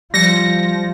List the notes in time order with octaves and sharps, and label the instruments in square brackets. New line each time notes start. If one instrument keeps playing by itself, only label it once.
[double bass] F3 [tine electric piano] G3 C#7 [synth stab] A#6